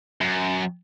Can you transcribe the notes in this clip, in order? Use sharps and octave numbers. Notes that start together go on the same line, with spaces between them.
F#2